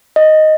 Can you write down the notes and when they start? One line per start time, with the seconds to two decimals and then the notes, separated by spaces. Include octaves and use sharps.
0.16 D#5